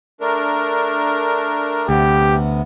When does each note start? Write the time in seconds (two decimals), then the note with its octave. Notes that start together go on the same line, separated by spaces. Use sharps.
0.21 A3 D4 A#4
1.89 D2 C3 B3 G4